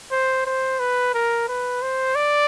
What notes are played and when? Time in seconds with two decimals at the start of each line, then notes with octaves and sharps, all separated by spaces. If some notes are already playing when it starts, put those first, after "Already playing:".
0.11 C5
0.46 C5
0.79 B4
1.14 A#4
1.48 B4
1.82 C5
2.15 D5